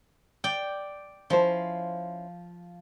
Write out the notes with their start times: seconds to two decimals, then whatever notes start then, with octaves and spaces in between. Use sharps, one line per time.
0.44 D5 G5
1.30 F3 C#4 E4 C5